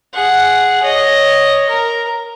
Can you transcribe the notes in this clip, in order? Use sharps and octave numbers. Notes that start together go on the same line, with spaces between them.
G#4 F#5
C#5 D#5
A#4